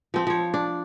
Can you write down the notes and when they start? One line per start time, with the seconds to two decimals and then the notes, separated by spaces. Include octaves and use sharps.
0.14 F3 C4
0.27 F3 C#5
0.54 D4